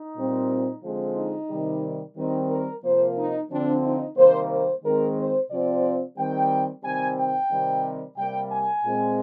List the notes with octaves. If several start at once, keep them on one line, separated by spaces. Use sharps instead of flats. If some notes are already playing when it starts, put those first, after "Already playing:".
Already playing: D#4
A#2 G3 C4
D3 F3 G#3 C4
D#4
C3 D#3 G3
D#3 G3 C4 D#4
A#4
C3 F3 A#3 C5
D#4
D3 F3 C4 D4
D#4
C3 D#3 G3 A#3 C5
C5
D#3 G#3 C4 A#4
C5
C3 F3 C4 D5
D#3 G3 C4 G5
C3 D#3 G3 C4 G#5
G5
C3 D#3 G3 C4
C3 G3 A#3 G5
G#5
A#2 G#3 C4